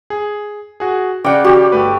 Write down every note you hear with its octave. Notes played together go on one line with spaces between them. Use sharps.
G#4
F#4 G#4
C#3 D5 F#5 G5
F#4 G4
G1 A3 B4